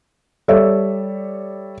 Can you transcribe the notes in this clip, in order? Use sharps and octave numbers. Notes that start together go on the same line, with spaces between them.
G3 A4 C#5 E5